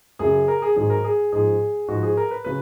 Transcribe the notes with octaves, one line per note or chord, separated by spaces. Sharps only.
F#2 C#3 F#3 G#4
A#4
G#4
G#2 D#3 F#3 G#4
A#4
G#4
G#2 F3 G#4
G#2 F3 F#4
G#4
A#4
B4
C#3 F#3 B4